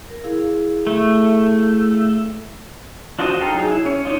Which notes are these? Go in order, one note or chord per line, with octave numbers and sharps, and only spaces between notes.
A#4
E4 G#4 F5
A3
D4 F4 F#4 C5 D#5
D#4 A4 F5 G5
F#3 D#4 G#4
E4
C#4 C#5
D4 D#4 F4